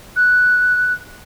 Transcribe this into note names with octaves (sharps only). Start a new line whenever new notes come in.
F#6